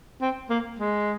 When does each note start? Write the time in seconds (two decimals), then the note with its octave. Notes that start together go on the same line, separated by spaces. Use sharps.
0.21 C4
0.50 A#3
0.79 G#3